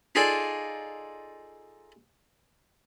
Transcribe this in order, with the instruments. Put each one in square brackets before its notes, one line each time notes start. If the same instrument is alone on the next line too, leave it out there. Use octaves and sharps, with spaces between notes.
[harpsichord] D#4 F4 G#4 A4 D5